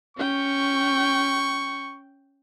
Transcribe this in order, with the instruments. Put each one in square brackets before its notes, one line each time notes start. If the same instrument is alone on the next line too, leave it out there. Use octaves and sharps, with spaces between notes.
[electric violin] C#4 G5 [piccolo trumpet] C#6